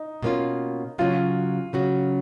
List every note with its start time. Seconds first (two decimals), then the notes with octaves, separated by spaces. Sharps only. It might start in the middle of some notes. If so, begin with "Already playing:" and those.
Already playing: D#4
0.22 B2 A#3 C#4 F4
0.98 C#3 F#3 C#4 F4 F#4
1.73 C#3 F#3 C#4 F#4